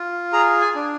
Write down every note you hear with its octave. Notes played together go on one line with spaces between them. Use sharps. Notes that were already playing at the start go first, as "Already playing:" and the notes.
Already playing: F4
G#4 A#5
G#5
D4